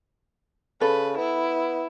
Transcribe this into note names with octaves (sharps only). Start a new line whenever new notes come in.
C#3 A4 B4
B3 E4